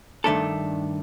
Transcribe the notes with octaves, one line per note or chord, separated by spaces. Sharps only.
G2 D#3 A3 D4 A4